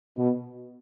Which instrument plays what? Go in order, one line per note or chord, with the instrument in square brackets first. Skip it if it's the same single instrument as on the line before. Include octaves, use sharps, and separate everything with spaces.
[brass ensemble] B2